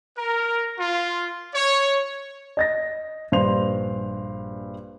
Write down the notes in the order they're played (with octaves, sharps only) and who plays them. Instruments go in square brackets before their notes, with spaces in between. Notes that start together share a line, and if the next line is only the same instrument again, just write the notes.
[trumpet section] A#4
F4
C#5
[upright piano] D#5 A6 A#6
A#1 G2 C5 C6 F7